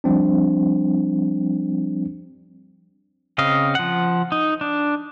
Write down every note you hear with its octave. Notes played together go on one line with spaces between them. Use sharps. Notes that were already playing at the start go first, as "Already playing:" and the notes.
F3 G3 C4 D4
C#3 C4 D#5 F5
F3 F#5
D#4
D4